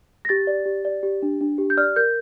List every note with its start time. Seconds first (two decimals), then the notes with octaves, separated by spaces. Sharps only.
0.25 A#6
0.29 G4 A6
0.47 D5
0.66 G4
0.85 D5
1.03 G4
1.22 D4
1.41 D4
1.58 G4
1.70 G6
1.77 D5 F6
1.96 A#4 G6